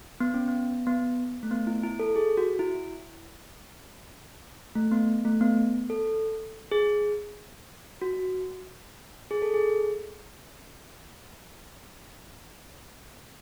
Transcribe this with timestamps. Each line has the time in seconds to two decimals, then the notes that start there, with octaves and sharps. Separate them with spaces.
0.20 B3
0.34 C#4
0.48 B3
0.87 B3
1.43 A3
1.51 B3
1.67 E4
1.83 E4
1.99 A4
2.16 G#4
2.37 F#4
2.59 E4
4.75 A3
4.92 B3
5.25 A3
5.41 B3
5.90 A4
6.72 G#4
8.02 F#4
9.31 G#4
9.42 A4
9.54 G#4